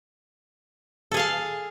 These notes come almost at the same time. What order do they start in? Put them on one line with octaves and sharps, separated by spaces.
A4 G#4 F5 A5